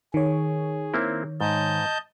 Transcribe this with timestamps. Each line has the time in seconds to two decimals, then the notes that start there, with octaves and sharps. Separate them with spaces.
0.14 D#3 G#4 C#5
0.94 A#3 C4 E4
1.41 G#2 D#5 A5 G6